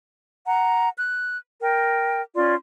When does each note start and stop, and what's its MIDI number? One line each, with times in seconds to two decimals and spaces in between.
0.46 0.90 78
0.46 0.90 82
0.97 1.37 90
1.61 2.22 70
1.61 2.22 79
2.35 2.54 61
2.35 2.54 65
2.35 2.54 74
2.35 2.54 84